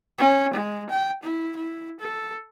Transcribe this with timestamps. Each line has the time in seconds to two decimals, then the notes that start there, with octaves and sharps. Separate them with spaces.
0.18 C#4
0.53 G#3
0.90 G5
1.23 E4
1.56 E4
2.00 A4